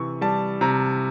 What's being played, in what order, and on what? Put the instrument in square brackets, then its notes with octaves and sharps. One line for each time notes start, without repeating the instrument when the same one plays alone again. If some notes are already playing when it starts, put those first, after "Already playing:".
Already playing: [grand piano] C3 E3 C#6
G3 A5
C3 A#5